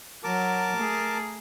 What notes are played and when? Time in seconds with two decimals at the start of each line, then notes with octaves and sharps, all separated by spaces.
0.24 F#3 A#4 A5 D6
0.77 A3 G#4